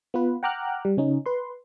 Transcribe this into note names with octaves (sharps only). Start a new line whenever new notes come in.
B3 F4 B4
F#5 G5 A#5 D6 F6 F#6
G3
C#3 C#4 D#4
B4 C6